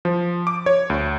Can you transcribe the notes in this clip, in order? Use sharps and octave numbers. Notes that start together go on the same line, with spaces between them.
F3
D6
C#5
D2